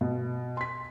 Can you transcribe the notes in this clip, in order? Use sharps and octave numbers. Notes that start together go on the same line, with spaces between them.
B2
C6 B6